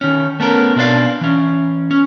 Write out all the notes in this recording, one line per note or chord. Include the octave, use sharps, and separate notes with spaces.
D#3 C#4
A3 B3 C#4 A#4
B2 C4 D4 F4 D5 F5
E3 C#4
C#4